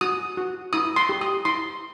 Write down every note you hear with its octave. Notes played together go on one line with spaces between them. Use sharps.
F#4 D#6
F#4
E4 D#6
C6
G4
D#6
E4 C6